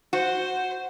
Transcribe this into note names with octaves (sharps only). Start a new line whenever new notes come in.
F#4 C5